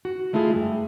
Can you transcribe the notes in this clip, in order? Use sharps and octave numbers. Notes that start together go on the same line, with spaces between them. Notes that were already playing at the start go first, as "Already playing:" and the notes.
F#4
G#3 A3 E4 F4 G#4
G2